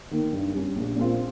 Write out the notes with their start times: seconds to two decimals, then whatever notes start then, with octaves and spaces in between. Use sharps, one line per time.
0.11 D#3 A#3
0.33 G2
0.54 G3 C#4
0.76 A#1
0.96 A#2 G#3 C4 F4